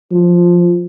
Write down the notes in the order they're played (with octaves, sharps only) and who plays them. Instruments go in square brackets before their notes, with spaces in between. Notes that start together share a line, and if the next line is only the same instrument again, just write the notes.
[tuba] F3